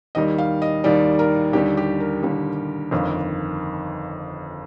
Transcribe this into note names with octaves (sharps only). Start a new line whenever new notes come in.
D#2 D#3 G3 D#5
F5
D#5
D#2 D#3 G3 D5
A#4
D#2 D3 G3 G4
G4
A#4
D#2 D3 G3
G1 F2 D#3